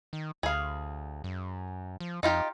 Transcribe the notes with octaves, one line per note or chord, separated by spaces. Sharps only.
D#3
D2 G#4 F5
F#2
F3
F2 D#4 F4 G4